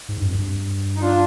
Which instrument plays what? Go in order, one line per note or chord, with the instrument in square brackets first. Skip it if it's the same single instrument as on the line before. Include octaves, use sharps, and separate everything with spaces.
[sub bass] G#2
G2
F2
G2
[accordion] D#4
D4 F4